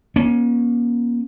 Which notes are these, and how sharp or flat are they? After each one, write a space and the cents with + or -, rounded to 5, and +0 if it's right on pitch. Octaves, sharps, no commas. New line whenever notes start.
A#3 +40 C#4 +0